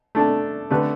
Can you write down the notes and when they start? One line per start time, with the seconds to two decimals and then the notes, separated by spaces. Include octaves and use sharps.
0.15 A3 D4 A4
0.70 D3 A3 G4 B4